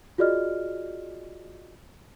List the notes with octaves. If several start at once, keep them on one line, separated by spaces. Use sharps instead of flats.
F4 F#4 G#4 D5 D#5 F6